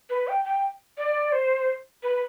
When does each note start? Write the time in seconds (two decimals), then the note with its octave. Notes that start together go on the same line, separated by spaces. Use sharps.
0.10 B4
0.28 G5
0.45 G5
0.98 D5
1.32 C5
2.03 B4